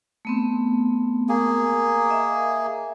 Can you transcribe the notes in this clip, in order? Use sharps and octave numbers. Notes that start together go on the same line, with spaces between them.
A3 B3 C4
A#3 G#4
D#5 E5